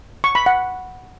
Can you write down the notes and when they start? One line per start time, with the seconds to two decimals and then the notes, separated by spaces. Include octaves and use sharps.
0.24 C#6
0.35 B5
0.46 F#5